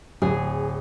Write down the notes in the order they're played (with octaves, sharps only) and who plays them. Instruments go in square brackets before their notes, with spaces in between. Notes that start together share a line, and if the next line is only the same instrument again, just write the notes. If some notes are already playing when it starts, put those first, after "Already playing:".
[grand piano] D1 [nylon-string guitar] G#4